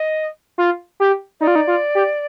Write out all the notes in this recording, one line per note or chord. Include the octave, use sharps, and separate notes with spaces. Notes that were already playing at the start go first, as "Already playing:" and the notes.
Already playing: D#5
F4
G4
D#4 D5
F4
D#4
F4
G4